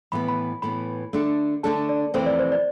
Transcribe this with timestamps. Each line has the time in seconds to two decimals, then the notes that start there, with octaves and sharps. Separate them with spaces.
0.12 A2 E3 B3 B5
0.29 B5
0.62 A2 E3 B3 B5
1.13 D3 A3 D4 A4
1.63 D3 A3 D4 A4 A5
1.89 D5
2.14 F2 C3 E3 A3 C4 C5
2.26 D5
2.39 C5
2.52 D5